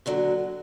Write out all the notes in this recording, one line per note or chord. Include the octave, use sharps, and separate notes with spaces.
D#2 D3 F#3